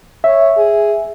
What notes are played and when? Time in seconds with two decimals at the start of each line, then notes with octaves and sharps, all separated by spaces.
0.24 C#5 E5
0.57 G#4